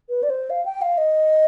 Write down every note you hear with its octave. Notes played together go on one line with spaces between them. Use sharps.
B4
D5
C5
F5
G5
F5
D#5